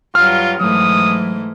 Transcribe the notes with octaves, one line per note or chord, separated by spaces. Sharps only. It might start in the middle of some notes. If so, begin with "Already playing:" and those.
G2 F#3 F4 F6
G#2 E3 F#3 A3 D#6